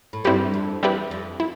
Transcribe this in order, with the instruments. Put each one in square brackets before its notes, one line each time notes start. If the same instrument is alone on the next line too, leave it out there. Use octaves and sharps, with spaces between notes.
[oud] A2
[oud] G2 [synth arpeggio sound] G3 C4 E4 G4 B4
[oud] F2
[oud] E2 [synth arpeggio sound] G3 C4 E4 G4 B4
[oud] F2
[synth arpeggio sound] E4